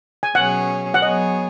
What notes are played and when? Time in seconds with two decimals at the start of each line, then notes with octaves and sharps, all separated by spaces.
0.23 G#5
0.35 B2 F#3 C#4 G#4 C#5 F#5
0.94 F#5
1.02 F#3 B3 G#4 C#5 D#5